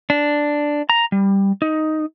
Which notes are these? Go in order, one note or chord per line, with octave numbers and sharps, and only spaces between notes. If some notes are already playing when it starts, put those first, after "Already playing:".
D4
A#5
G3
D#4